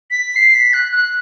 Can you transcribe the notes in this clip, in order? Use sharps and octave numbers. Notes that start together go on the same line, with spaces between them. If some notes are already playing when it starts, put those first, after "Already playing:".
B6
C7
B6
F#6
F#6